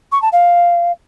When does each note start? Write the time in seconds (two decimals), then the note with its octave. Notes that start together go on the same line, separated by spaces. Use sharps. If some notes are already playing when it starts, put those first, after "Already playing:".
0.12 C#6
0.22 A5
0.32 F5